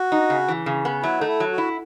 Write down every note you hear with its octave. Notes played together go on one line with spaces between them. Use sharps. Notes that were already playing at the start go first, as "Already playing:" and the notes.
Already playing: F#4
D#4
C#3
E3
C#3
B3
F#3 E4
A3 D#4
E4
F#3
F#4
E4